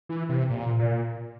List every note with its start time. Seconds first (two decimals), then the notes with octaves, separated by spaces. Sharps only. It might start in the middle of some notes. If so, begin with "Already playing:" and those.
0.09 E3
0.29 C3
0.50 A#2
0.79 A#2